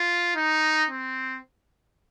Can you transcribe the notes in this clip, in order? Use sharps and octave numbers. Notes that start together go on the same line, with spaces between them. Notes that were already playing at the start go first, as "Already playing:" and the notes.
Already playing: F4
D#4
C4